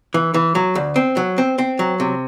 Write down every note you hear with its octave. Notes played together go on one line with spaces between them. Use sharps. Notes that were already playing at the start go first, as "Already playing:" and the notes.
E3
E3
F#3
D2
C4
F#3
C4
C4
F#3
C3